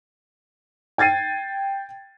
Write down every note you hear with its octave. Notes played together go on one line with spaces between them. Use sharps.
G5 G#6 A6 C7 D#7